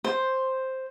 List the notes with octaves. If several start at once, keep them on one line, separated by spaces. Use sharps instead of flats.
C5